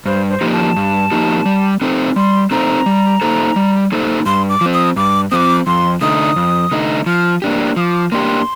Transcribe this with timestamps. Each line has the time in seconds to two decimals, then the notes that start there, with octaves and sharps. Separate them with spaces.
0.06 G2 C5
0.30 C5
0.41 F3 A#3 D#4 G4
0.53 A5
0.76 G2
1.12 F3 A#3 D#4 G4
1.46 G3
1.81 C4 D#4 A4 C5
2.16 G3 C6
2.51 C4 D#4 A4 C5 A#5
2.86 G3
3.21 A#3 D#4 A4 C5
3.56 G3
3.92 A#3 D#4 A4 C5
4.26 G2 C6
4.49 D6
4.61 F3 C4
4.74 D#6
4.96 G2 D6
5.31 F3 C4 D6 D#6
5.66 F2 C6
6.01 D3 A3 D#4 D#6
6.36 F2
6.72 D3 A3 D#4
7.06 F3 F6
7.42 A#3 D4 G4
7.76 F3 D#6
7.80 D6
8.12 A#3 D4 G4 C6